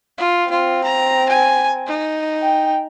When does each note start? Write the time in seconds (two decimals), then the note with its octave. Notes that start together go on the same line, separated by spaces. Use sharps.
0.18 F4
0.50 C4 F4
0.84 A#5
1.29 G#5
1.87 D#4
2.42 G5